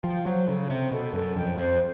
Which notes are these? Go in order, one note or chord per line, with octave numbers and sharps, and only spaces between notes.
F3 G5
F#3 C5
C#3 A4
C3 G5
B2 A4
F#2 A4
F2 G5
F2 C5